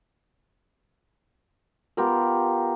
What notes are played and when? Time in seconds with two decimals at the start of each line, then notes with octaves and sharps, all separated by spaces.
1.97 B3 F4 G4 A#4